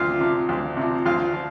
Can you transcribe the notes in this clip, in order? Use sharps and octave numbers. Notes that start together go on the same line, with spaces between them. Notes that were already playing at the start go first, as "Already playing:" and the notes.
Already playing: D2 C3 F4 F5
C3 F3
D2
C3 F3
D2 F4 F5
F3